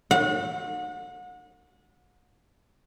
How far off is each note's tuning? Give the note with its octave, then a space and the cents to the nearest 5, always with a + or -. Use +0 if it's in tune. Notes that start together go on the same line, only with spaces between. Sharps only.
F#5 -35